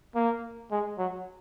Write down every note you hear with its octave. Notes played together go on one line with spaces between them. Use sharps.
A#3
G#3
F#3